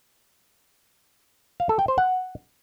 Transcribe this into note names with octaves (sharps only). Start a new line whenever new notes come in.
F5
A4
G5
C5
F#5